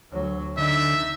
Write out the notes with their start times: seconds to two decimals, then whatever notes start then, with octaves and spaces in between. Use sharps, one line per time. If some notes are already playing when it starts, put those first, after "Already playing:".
0.12 D2 F#3
0.58 D3 D#4 E5